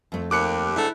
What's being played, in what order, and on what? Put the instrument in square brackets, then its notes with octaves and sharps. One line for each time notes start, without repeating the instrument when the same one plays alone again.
[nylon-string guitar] F2 A3
[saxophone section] D#2 [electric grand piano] D6 F#6 C#7
[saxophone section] G#2 D3 A3 [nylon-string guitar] E4